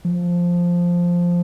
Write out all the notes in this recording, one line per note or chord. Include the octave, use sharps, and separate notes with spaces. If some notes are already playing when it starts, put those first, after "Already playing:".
F3